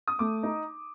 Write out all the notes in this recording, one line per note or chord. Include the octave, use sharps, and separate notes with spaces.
D#6
A3 D6
D#4